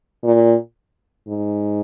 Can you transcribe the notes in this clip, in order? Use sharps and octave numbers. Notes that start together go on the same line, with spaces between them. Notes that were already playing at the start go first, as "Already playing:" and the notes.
A#2
G#2